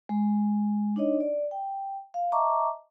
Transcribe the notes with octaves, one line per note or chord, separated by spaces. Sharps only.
G#3
D4 D#4 C#5 D#5
D5
G5
F5
D#5 E5 A5 A#5 C#6 D6